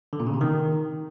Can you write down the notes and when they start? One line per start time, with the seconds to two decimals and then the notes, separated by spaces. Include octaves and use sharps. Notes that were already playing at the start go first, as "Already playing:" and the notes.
0.13 D3
0.20 A#2
0.27 C#3
0.34 C3
0.41 D#3